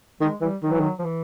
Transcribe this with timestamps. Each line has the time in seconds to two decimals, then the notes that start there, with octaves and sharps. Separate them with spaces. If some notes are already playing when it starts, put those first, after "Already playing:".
0.21 D#3 G#3
0.41 E3 G3
0.63 D#3 F#3
0.72 E3
0.80 D#3
0.99 F3
1.04 E3